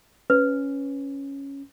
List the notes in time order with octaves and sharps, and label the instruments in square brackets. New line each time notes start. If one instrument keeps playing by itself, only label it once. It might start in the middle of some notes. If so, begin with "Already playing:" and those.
[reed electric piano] C#4 [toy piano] B4